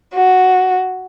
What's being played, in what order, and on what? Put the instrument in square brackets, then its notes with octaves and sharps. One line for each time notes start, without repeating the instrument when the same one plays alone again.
[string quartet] F#4